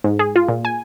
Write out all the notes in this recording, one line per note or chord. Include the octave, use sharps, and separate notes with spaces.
G#2
G#4
F4
A#2
G#5